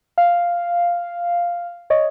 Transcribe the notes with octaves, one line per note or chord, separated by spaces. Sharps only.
F5
C#5 D#5